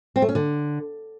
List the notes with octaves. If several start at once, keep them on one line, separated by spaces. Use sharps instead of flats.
C4
A3
C#4
D3